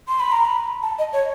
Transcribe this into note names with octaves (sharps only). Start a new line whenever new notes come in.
C6
B5
A#5
B5
A5
D#5
C#5